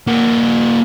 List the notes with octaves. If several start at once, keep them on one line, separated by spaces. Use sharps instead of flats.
A#3 F#4